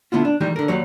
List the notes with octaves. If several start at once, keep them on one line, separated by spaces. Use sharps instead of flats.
D3 B3 E4 F4
D4
D#3 E3 G3 G#3
D3 A#4
D#2 F#3 G3 C#5